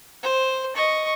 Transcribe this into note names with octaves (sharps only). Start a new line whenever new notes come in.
C5
D#5 C#6